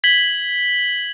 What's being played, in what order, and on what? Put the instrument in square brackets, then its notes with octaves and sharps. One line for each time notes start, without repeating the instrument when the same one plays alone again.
[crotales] G#6 B6 F#7 G7